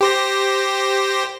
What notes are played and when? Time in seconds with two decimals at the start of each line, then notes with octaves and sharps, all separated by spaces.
0.01 G4 C5 A#6